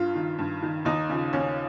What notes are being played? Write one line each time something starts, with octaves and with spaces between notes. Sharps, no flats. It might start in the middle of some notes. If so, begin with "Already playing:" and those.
Already playing: G2 F4
D#3
G2
D#3
D#2 D#4
C#3 F3
D#2 C#4